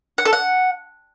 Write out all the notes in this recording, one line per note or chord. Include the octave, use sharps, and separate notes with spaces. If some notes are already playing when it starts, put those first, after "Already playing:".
F#5
A4
F#5